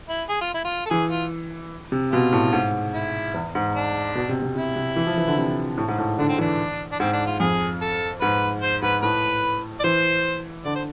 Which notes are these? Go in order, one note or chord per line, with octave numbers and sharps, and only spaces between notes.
E4
G#4
F4
E4
F4
A4
E3 G#4
F4
C3
B2 F4
A2
G#2
E4
E2
G#2
D4
B2
C3
C3
C3 E4
C3
E3
F3
E3
D3
C3
A2
G#2
A2
D3 D4
C4
E3 D4
D4
G#2 C4
D4
F4
F2 G#4
A4
G#2 B4
C5
G#2 B4
A2 B4
D5
E3 C5
D3 D5
C5